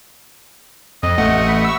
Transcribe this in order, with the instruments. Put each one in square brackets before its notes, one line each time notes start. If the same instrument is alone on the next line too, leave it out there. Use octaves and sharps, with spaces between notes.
[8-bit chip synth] F2 [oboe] D#5
[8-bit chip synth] A1 A3 F#5
[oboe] B5
[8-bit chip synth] C#6 E6